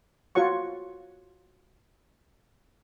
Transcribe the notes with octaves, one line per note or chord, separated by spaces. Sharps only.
F4 F#4 C#5 F#5 C#6